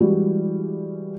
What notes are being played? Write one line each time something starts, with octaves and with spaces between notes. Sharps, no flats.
E3 G3 G#3 E4 F#4